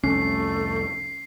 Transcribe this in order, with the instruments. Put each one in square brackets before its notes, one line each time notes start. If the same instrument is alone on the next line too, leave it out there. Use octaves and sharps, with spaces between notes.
[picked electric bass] C2 F2 [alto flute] A3 [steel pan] C#4 [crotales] C7